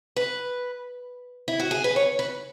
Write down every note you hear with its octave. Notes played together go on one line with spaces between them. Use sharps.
B4
E4
F#4
G#4
B4
C#5
B4